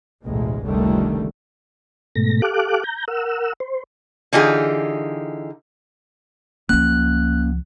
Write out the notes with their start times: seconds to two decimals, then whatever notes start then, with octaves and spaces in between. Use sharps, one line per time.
0.25 A1 D2 B2 G#3
0.65 F1 C#2 D3 D#3 G3 A3
2.15 G#2 B2 A3 A#6
2.42 G4 A4 F5 D6 F#6
2.84 A#5 G6
3.08 A#4 F#5 E6
3.60 C5
4.33 D3 E3 D#4 F4 G4 G#4
6.69 C#2 F3 A#3 C#4 F#6